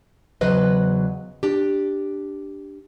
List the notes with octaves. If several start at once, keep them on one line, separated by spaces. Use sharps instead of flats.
E2 C#3 F#3 B4 C5 D#5
D4 G4